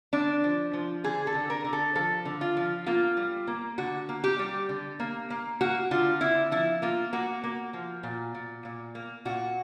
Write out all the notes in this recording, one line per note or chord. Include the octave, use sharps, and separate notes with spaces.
D3 D4
F3
F3
D3 G#4
A4
D3
A#4
D3
A4
F3 A4
D3
F4
F3
A#3 F4
G3
A#3
D3 F#4
A#3
G4
G3
D3
A#3
A#3
A#3 F#4
D3 F4
D3 E4
F3 E4
A#3 F4
A#3 F#4
A#3
F3
A#2
A#2
A#2
A#3
A#2 F#4